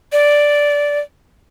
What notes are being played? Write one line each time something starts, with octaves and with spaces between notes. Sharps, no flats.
D5